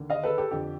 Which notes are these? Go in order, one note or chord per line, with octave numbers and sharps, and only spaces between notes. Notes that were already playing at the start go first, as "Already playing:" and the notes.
Already playing: D#2 D3
D#5 F5
A4 B4
G4 A4
F2 D3 G4